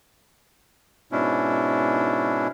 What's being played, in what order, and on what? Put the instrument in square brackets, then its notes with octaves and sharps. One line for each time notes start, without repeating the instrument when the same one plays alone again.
[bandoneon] G#2 B2 C#4 D4 E4